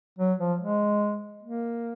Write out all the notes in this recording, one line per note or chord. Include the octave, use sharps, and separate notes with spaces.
F#3
F3
G#3
A#3